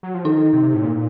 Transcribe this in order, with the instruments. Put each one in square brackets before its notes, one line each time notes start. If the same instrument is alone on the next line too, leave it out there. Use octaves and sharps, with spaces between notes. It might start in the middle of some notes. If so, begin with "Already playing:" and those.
[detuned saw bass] F#3
F3
[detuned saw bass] D#3 [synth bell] D#4
[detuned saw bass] C3
A2
A#2